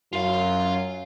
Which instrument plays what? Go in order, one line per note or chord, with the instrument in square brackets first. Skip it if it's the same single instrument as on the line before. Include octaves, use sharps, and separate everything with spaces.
[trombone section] F#2 [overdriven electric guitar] F4 F5